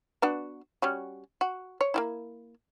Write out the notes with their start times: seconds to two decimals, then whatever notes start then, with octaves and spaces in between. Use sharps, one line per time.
0.22 B3 D4 F#4
0.82 G3 C#4 F#4
1.41 F#4
1.81 C#5
1.94 A#3 D#4 E4